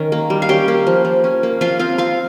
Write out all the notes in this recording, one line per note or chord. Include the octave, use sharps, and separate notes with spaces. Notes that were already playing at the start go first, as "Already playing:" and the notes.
Already playing: D#3 C#4
A#3
G3
F5
C#4 G4 G5
A#3
F3
F3
C#4
A#3
F3 F4 F5
C4 F4 F5
C4 F4 F5